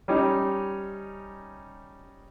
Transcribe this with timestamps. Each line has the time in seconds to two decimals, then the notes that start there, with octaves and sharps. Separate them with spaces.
0.08 G3 C#4 D#4